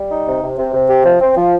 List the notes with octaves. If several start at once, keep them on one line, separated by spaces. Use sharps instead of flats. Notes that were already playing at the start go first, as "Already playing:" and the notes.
Already playing: G3
D#4
C3
C3
C3
C3
G4
F3
C4
F3